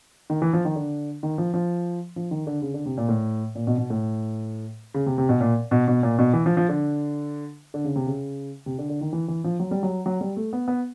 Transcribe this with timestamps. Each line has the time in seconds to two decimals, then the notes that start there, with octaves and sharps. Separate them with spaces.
0.30 D#3
0.42 E3
0.53 F3
0.65 D#3
0.76 D3
1.23 D#3
1.38 F3
1.54 F3
2.16 F3
2.31 D#3
2.47 D3
2.62 C#3
2.74 D3
2.86 C3
2.97 A#2
3.09 A2
3.55 A#2
3.67 B2
3.78 B2
3.90 A2
4.94 C#3
5.06 C3
5.18 C3
5.29 B2
5.41 A#2
5.71 B2
5.88 B2
6.03 A#2
6.18 B2
6.33 E3
6.46 F3
6.57 F3
6.69 D3
7.74 D3
7.84 C#3
7.96 C3
8.07 C#3
8.66 C3
8.78 D3
8.89 D3
9.01 D#3
9.13 E3
9.28 E3
9.44 F3
9.60 F#3
9.71 G3
9.83 F#3
10.06 F#3
10.21 G3
10.37 A3
10.53 B3
10.68 B3